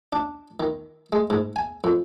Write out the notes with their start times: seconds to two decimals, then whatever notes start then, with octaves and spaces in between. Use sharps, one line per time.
0.13 D4
0.60 D#3
1.12 G#3
1.30 G#2
1.56 G#5
1.84 F2